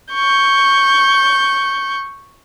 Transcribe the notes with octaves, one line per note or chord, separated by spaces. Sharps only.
C#6 G6